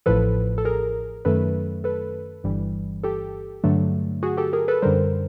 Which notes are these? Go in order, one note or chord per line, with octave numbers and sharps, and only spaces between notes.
A1 A2 F3 A4 B4
A4
G#4 A#4
F#2 D#3 F#3 A3 A4 B4
A4 B4
G1 G2 E3 G3
G4 A4
G2 D3 F#3 A3
F#4 G#4
G4 A4
G#4 A#4
A4 B4
F#2 D3 G3 A#4 C5